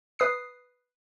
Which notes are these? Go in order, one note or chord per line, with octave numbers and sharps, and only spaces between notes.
B4 D#6 C7